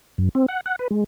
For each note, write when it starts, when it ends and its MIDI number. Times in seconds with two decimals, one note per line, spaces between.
0.18 0.29 42
0.35 0.46 60
0.48 0.61 78
0.66 0.76 78
0.79 0.88 71
0.90 1.04 56